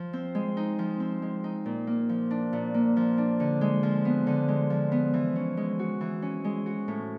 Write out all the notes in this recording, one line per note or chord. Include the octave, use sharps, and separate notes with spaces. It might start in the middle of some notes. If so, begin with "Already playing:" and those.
Already playing: F3
C4
G#3
D#4
F3
C4
G#3
D#4
A#2
A#3
F3
D4
A#2
A#3
F3
D4
D3
G#3
F3
B3
D3
G#3
F3
B3
E3
C#4
G#3
F#4
E3
C#4
G#3
F#4
A2